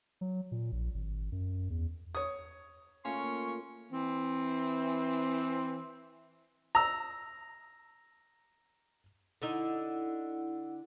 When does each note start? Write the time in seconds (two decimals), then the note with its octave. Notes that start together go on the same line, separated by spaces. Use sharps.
0.21 F#3
0.52 A#2
0.72 A#1
0.95 G#1
1.32 F#2
1.70 E2
2.15 C#5 D#6
3.05 A#2 A3 C#4 F4 C6 C#6
3.91 E3 C4
6.75 A#5 E6
9.42 D3 D#4 E4 F#5